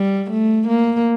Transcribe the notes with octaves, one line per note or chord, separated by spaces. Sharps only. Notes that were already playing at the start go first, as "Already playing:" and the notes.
Already playing: G3
A3
A#3